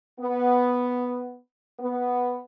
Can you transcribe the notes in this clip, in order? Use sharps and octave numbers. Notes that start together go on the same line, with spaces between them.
B3
B3